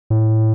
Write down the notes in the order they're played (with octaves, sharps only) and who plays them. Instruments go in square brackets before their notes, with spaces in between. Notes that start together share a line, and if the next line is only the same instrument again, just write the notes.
[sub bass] A2